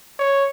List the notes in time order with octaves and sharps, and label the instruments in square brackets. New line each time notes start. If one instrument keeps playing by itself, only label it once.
[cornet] C#5